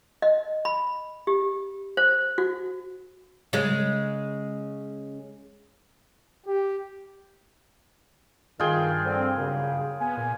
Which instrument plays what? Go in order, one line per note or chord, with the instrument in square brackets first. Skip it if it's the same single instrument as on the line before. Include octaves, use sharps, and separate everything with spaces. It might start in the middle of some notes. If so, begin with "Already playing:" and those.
[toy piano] D#5
B5
G4
C5
F#4
[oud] C#3 G#3
[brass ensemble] G4
[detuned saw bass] G2 [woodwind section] D#3 [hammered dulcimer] F4 G#4 G5
[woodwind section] D3 F3 C4
F#2 A#2 C#3
[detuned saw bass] B3 [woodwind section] G#5
[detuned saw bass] A#2